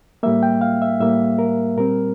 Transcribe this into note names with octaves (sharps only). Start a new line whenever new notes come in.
A2 G3 A#3 E5
G5
F5
E5
A2 G3 A#3 E5
A#4
A#2 G3 C4 A#4